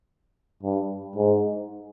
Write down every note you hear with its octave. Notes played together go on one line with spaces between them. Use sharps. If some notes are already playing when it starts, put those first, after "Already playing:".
G2
G#2